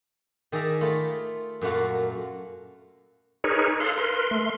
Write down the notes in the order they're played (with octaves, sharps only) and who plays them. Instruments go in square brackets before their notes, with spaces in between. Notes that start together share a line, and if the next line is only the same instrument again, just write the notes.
[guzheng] D#3 G#4 D5 E5 A#5
A3 F4 B5
F#2 A#2 A3 F#4 F5
[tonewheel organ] D#4 G#4 A#4 B4 C#5
A4 F5 C6 F#6
A#4 B4 C6
A3 C6